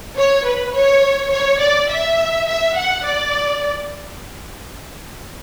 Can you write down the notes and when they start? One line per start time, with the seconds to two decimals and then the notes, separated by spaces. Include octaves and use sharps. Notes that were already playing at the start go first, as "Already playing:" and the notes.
0.17 C#5
0.46 B4
0.74 C#5
1.32 C#5
1.60 D5
1.90 E5
2.47 E5
2.76 F#5
3.05 D5